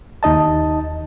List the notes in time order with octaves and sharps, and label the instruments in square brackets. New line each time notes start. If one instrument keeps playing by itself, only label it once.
[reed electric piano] D#2 D#4 D#5 A5